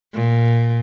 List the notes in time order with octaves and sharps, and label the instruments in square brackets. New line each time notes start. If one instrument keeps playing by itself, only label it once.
[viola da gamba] A#2